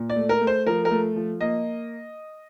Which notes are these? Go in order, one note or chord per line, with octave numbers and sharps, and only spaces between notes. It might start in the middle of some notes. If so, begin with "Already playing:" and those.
Already playing: A#2
D5
A3
A#4
A3
C5
F3 A#4
A#4
A3
F3
A#3 D#5